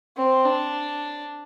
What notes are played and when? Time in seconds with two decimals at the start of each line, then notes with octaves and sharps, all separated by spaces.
0.17 C4
0.45 D4